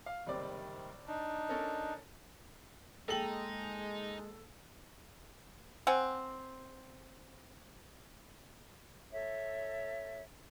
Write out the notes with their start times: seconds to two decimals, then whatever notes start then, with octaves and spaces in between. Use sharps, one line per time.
0.06 F5
0.27 F#1 C3 D#3 G3 C4 D5
1.07 D4 D#4
1.49 C#4 A4 A#4
3.08 G#3 A#3 D#4 G#4 A4 G5 F#7
5.87 C4 F#5 G#5
9.12 A4 C#5 E5